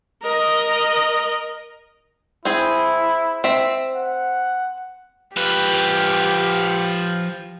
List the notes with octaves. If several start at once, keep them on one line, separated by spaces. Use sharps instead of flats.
A#4 D#5
C4 E4 G#4
C4 E5
F#5
F3 G4 B4